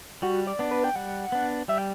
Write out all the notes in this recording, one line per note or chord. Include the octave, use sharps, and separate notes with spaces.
G3 F#4
D5
B3 D4
B4
G5
G3 F#5
B3 D4
G3 E5
G5